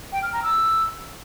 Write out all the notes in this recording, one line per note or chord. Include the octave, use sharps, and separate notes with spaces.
G5
F6
A#5
E6